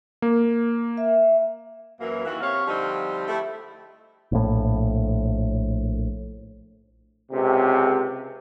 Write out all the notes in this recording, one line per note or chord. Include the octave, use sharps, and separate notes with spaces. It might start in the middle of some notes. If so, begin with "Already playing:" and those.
A#3
E5
F#2 E3 A#3
D#2 E3 E4 F#4
C3 C#5 F5
D3 F3 G3 C4 D4 D#4
A3 E4 G4
A#1 A2
C#2 C3